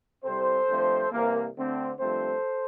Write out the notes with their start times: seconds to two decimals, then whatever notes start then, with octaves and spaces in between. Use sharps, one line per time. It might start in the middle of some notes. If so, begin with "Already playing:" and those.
0.24 C2 C3 G3 C4 A4 C5
0.68 G2 F3 A3 C4
1.12 C2 C3 E3 A#3
1.55 D2 D3 A3 C4
1.99 G2 F3 A3 C4 A4 C5